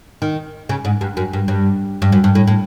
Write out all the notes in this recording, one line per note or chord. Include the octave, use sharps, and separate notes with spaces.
D#3
C#3
G#2
G2
F#2
G2
G2
G2
F#2
G2
A2
A2